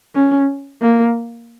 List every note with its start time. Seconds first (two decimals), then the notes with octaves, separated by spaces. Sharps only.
0.15 C#4
0.82 A#3